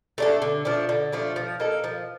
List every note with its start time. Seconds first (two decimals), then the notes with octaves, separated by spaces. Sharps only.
0.18 A3 D4 A4
0.42 D3
0.65 F3 A3 D4
0.89 D3
1.12 F3 A3 D4
1.36 F3
1.60 A#3 D#4 A4
1.84 F3